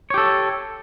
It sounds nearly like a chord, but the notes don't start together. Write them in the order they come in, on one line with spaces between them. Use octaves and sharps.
C#5 G4 A4